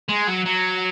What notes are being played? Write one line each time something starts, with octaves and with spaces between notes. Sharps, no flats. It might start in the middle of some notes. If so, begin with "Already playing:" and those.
G#3
F#3
F#3